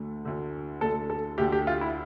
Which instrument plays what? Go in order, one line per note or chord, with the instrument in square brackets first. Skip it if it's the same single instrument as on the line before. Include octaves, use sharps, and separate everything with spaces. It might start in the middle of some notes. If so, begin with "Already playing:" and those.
Already playing: [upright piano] D2 D3 A3
D2 D3 A3
[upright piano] D2 D3 A3 [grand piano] A4
[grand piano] A4
[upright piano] D2 D3 A3 [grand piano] G4
[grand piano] G4
F4
E4